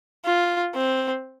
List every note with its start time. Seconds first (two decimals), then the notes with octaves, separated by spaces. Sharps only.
0.25 F4
0.75 C4